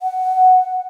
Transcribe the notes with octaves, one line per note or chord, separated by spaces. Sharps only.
F#5